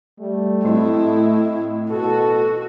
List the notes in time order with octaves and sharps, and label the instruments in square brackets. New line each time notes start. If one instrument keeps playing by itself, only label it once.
[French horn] G3 [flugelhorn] A3
[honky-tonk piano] A2 C4 C6 [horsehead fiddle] E4 [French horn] D#5
[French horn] B2 [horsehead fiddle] F#4 [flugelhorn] A4